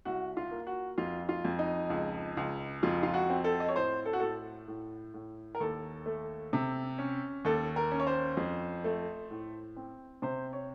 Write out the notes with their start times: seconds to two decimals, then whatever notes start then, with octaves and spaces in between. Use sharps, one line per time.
0.05 C2 F#4
0.37 F4
0.51 A#3
0.67 F#4
0.98 F2 F4
1.29 F4
1.45 F2
1.59 D#4
1.90 C#2
2.37 C#2
2.83 F2 F4
3.03 F4
3.14 F#4
3.30 C4
3.44 A4
3.60 D#5
3.69 C#5
3.76 A2 C5
4.05 A4
4.13 F#4
4.20 A2 A4
4.68 A2
5.14 A2
5.55 A#4
5.60 D#2 A4
6.06 A3
6.53 C3
6.98 C#4
7.45 D#2 A4
7.76 A#4
7.91 C#4
8.00 C#5
8.07 C5
8.37 F2
8.84 A3
9.31 A2
9.76 C4
10.22 C3 C5
10.53 C#5